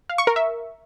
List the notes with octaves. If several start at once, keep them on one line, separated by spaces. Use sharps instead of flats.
F5
C#6
A#4
E5